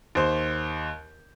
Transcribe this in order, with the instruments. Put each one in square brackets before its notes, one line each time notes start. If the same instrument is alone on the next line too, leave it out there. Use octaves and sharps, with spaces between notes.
[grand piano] D#2 C5